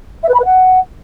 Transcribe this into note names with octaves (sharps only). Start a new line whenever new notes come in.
E5
B4
B5
B4
F#5